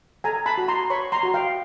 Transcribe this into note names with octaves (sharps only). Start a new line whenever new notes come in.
A4 G#5 A#5
A5 B5
F#4
A#5 C6
C#5 B5 C#6
A#5 C6
F#4
F5 G5